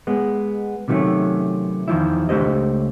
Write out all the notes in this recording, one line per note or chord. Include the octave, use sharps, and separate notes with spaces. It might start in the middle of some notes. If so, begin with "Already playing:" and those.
G#3 B3
C3 D#3 F#3 G3 A3 C#4
E2 D#3 F3 E4
C#2 A3 D4 G4 C5 D#5